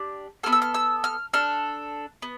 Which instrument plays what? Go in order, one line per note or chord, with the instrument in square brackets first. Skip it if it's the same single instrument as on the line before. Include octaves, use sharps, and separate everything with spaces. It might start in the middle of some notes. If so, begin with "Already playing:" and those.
Already playing: [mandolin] D4 G4
B3 F4 A4 F6
E6
F6
E6
F6
D4 A4 F6
B3